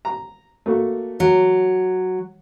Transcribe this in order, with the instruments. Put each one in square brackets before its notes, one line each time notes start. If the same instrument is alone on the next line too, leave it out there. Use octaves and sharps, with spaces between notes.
[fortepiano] A#5
A3 A#3 F#4
[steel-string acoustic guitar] F#3